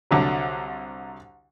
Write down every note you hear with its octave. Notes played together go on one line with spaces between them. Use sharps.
C2 D3 F#3